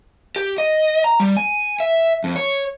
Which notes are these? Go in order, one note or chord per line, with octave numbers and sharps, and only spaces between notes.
G4
D#5
A#5
G3
G#5
E5
F2
C#5